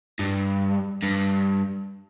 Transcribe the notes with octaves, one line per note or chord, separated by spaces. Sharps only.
G2
G2